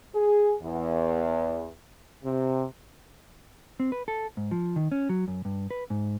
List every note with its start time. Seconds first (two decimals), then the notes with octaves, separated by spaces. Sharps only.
0.15 G#4
0.61 E2
2.23 C3
3.80 C4
3.92 B4
4.08 A4
4.37 G#2
4.51 F3
4.76 D#3
4.92 C#4
5.09 F#3
5.28 F#2
5.45 G2
5.71 B4
5.90 G#2